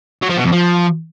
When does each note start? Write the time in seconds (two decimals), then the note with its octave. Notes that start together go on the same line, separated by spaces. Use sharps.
0.22 F#3
0.29 F3
0.37 B2
0.44 F2
0.52 F3